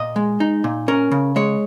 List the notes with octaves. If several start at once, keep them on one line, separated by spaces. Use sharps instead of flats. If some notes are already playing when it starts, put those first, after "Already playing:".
Already playing: A#2 D#5
G#3
D#4
A#2
C#4 A#4
C#3
G#3 C#5